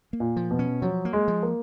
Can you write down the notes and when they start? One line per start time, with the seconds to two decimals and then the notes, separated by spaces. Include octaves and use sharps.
0.13 A#3
0.20 A#2
0.36 F3
0.51 B2
0.59 C#4
0.82 F3 F#3
1.05 A#3
1.13 G#3
1.28 F3
1.43 A#3